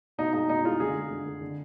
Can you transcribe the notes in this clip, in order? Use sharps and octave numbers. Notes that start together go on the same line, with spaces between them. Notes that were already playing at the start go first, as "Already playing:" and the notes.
B2 D#4
G#3 D#4
B2 D#4
G#3 F4
D3 G#4
G#3
D3
G#3
D3